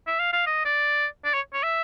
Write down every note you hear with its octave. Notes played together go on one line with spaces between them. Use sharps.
E5
F5
F5
D#5
D5
D5
C#5
C#5
E5